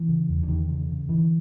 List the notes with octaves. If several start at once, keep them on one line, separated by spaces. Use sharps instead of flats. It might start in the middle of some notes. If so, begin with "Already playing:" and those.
Already playing: E3
C#3
E2
D3
E2 D#3
C#3
C#3
D3 E3